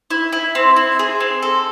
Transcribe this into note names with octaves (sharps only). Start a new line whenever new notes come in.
E4
E4
C4
E4
G#4
C4
A4